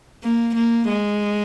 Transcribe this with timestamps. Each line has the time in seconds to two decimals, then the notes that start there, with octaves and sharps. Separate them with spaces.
0.23 A#3
0.55 A#3
0.89 G#3